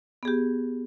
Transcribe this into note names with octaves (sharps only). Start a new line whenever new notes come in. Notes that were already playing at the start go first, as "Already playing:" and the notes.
B3 G4 G#4